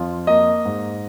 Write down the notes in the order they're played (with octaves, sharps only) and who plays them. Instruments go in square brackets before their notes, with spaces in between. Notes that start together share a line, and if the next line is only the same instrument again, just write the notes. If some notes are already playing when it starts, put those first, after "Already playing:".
Already playing: [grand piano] F2 F4
A#3 D#5
G#2